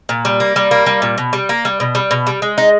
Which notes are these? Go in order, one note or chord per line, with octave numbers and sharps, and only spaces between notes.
A#2
G3
A#3
G3
A#3
G3
A#2
B2
G3
A#3
G3
B2
G3
B2
G3
G#3
D#4